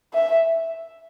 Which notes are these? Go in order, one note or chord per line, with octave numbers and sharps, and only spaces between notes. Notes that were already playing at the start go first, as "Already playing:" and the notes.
E5